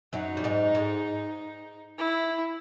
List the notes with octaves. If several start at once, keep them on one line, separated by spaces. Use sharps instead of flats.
F#2 F#3 D#4
G3
G#2 G#3
G#2 G#3
E4